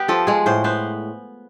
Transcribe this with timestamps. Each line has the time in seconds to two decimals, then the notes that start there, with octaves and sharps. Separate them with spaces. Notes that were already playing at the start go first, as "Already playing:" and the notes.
Already playing: B3 G4
0.08 F3 A4
0.27 G#3 G#4
0.46 A2 C5
0.64 B3 C5